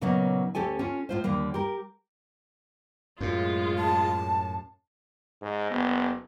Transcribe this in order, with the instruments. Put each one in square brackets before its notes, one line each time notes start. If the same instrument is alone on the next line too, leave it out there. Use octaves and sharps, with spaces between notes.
[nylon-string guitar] A#2 C#3 F#3 A#3 B3 D#4
D2 C#4 G4 A4 G#5
C#4 F4
A2 F4 C5
D#2 D3 G3 A#3
G4 A#4
[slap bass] F#2 A2 [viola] G#3 F4
[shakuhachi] A5
[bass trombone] G#2
[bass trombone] F#1 [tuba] B3